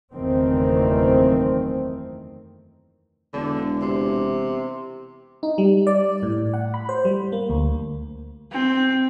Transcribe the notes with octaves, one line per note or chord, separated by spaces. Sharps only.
F#1 E2 D#3 A3 C4
E1 D3
C3
D#4
G3
D5
A2
F#5
B5
C5
G3
A#3
D2
C4